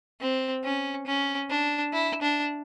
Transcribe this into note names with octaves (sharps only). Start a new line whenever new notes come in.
C4
C#4
C#4
D4
E4
D4